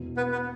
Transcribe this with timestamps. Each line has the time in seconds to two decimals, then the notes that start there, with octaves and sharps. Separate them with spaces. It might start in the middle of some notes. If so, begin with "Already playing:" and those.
Already playing: E1 E2 B2
0.17 B3 B4
0.32 B3 B4